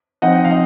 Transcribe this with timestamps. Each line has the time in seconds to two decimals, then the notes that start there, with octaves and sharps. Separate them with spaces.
0.22 F3 C4 D#4 D#5 F#5
0.45 F5
0.51 D#5